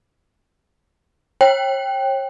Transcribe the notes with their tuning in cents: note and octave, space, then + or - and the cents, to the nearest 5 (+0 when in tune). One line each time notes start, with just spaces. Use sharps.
C#5 -35 G5 +0